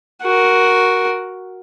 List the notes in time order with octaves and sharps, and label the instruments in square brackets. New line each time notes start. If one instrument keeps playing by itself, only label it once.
[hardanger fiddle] F#4 A#4